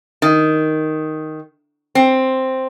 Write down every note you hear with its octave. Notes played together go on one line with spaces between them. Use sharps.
D#3
C4